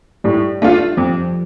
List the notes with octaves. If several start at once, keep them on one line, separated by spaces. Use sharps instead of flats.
A2 G3
A3 D4 F4
F2 F3